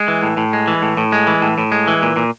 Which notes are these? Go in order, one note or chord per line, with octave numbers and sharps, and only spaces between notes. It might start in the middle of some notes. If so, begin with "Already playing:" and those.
Already playing: G#3
E3
A2
A2
G#3
E3
A2
A2
G#3
E3
A2
A2
G#3
E3
A#2
A#2